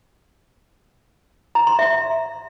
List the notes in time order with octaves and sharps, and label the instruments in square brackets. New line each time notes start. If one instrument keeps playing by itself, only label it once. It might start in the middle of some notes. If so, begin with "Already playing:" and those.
[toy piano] A#5
C6
E5